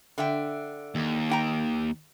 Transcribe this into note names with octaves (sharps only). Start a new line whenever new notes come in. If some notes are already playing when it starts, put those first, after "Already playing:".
D3 E5 G5
D#2
D4 G5 A#5